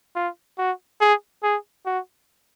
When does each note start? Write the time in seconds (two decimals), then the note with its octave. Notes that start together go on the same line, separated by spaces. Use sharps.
0.16 F4
0.59 F#4
1.01 G#4
1.43 G#4
1.86 F#4